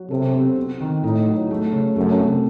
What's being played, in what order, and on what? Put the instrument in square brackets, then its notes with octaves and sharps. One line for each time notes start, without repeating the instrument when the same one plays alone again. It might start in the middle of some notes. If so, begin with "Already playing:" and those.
Already playing: [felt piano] F#3 F#4
[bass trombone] C3 [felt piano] A4
[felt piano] C4
C4
D#3
[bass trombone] A2 [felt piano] D#4
[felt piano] F#3
A3
C#3
[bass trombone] F#2 [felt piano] A3
[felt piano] C3